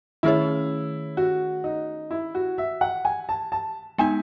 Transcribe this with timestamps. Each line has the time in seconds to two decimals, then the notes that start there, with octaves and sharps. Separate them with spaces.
0.23 D#3 A3 C#4 E4 G#4 C#5
1.17 F#4
1.64 D#4
2.11 E4
2.35 F#4
2.58 E5
2.81 F#5
3.05 G#5
3.29 A5
3.52 A5
3.98 G#3 B3 D#4 G#5